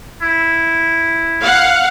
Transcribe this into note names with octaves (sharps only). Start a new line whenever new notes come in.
E4
F5 F#5